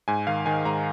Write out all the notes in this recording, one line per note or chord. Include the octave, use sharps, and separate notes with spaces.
G#2 G#5
D#3 F5
D#3 G#5
G#2 A#5